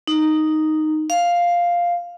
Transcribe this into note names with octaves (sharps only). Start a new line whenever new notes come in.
D#4
F5